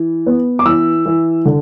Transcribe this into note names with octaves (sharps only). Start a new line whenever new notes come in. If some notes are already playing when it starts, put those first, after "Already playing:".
Already playing: E3
B3
D6
E3 E6
E3
D3